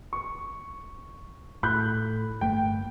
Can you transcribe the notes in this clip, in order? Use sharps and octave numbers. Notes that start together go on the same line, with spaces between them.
C#6
A2 B5 F#6 G6
G1 A3 A#3 G5